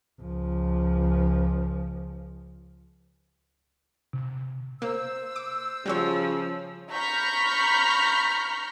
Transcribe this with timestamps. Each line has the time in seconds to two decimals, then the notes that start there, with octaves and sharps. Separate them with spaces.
0.21 C#2 F3
4.13 C3
4.82 A#3 C5 E6
5.36 D6
5.86 C#3 F3 G3 F#4 C#5
6.91 A#5 B5 C#6 F6 G6 B6